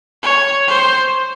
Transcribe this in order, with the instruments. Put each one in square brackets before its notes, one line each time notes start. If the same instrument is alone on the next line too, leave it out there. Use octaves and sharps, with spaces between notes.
[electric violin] C#5
C5